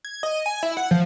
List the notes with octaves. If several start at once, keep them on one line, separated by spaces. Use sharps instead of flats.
G#6
D#5
G#5
E4
F#5
F3